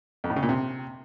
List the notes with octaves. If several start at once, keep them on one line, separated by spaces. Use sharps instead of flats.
F2
A2
C#3
A#2
C3